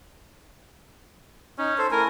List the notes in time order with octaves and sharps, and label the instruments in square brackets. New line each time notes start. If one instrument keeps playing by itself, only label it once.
[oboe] C#4 [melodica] D#4
[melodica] A4 C5
[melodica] A3 E4 G#5 [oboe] A#4